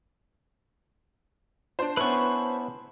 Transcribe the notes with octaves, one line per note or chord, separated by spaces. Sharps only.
D4 C5
B3 C#4 E4 B4 C#6